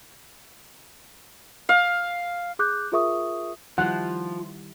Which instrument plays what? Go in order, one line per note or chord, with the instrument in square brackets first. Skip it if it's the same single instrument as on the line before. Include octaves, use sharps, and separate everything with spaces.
[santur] F5
[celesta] G#4 D6 F#6 G6
F4 G#4 A#4 E5 C#6 D#6
[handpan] D#3 G3 E4 [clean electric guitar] F3 [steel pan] F#5